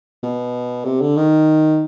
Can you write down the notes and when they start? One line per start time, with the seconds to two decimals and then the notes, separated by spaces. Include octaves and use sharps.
0.23 B2
0.85 C3
1.01 D3
1.17 D#3